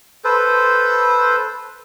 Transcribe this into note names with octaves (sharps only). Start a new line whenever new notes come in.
A4 B4 C5